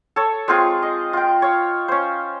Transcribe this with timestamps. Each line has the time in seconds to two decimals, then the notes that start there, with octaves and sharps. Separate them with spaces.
0.16 A4 C#5
0.48 G#3 C4 F4 G#4
0.82 D#5
1.13 F4 G5
1.42 C#5 F5
1.88 C#4 C5